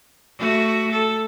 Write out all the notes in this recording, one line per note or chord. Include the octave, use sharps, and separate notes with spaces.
A3 F#4
A4